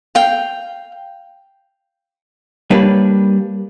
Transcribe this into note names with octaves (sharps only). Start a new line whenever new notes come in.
F5 G5
G3 A#3 D4 B4 C#5